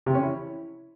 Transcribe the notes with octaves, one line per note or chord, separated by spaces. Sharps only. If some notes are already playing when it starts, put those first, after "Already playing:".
C3
C#4
E4